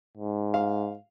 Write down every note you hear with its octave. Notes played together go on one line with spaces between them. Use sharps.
G#2
F5